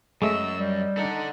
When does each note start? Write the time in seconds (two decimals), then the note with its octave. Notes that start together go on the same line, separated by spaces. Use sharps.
0.22 F#2 G#3 A3 D#5 E6
0.60 G3 D#5
0.97 D4 D#4 A4 F#5